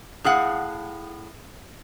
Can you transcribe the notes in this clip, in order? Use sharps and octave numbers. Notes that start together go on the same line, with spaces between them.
A2 G#4 F5 F#5